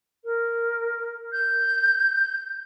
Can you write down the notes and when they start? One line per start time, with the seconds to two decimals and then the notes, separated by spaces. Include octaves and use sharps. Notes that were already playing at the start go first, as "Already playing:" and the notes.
0.24 A#4
1.32 G6